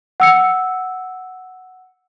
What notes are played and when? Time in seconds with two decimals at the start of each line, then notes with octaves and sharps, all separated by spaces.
0.20 F#5 E6 C#7